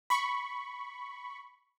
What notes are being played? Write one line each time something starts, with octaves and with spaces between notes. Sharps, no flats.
B5 C#6